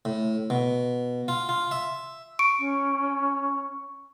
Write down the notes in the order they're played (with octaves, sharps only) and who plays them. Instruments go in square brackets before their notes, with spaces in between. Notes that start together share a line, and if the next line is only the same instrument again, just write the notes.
[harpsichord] A2
B2
F4
F4
E5
[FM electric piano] C#6 [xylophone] D7
[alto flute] C#4